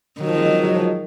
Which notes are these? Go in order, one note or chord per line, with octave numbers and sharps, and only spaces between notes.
D#3 F#3
F3
G#3
F#3
G#3
F#3
F3